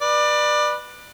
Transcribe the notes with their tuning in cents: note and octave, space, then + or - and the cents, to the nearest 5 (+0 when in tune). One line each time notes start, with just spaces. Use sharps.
B4 -15 D5 +25